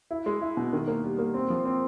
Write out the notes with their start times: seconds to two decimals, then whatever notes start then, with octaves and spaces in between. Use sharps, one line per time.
0.11 E4
0.26 G#3
0.42 E4
0.57 B2
0.73 D#3
0.88 A#3
1.04 G3
1.19 A#3
1.34 C4
1.50 F3
1.66 C4